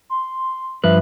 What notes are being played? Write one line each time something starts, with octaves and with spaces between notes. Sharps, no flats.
C6
G2 F3 B4 E5